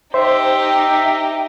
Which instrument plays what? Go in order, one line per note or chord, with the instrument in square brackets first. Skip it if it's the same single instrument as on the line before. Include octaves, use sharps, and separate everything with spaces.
[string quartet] D#4 G4 [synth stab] C5 [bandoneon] E5